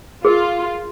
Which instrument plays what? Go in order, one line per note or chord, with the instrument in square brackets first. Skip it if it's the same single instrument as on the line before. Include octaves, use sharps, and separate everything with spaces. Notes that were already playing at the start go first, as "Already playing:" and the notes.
[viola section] F4 [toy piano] G#4 A#4